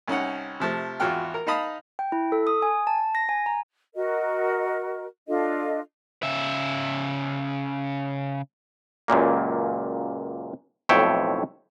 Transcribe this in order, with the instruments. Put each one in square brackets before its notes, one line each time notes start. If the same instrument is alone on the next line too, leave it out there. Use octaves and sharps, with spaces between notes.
[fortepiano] C2 C#4 D#4 F#5
C3 F3 A3
G#1 E2 F4 F#4 G5 F6
A#4
D#4 D#5 F5 A5 B5 D#6
[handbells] G5
E4
A4
D#6
G#5
A5
A#6
G#5
A#5
[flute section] F#4 A#4 D#5
D4 F4 A4 D#5
[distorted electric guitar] C#3 E5
[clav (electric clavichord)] C#2 F#2 A#2 A#3
B1 F2 A2 C#5 E5 G5